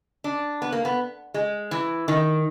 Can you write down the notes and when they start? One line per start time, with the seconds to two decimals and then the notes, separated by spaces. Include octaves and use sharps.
0.24 D4
0.62 B3
0.72 A#3
0.85 B3
1.34 G#3
1.71 E3
2.08 D#3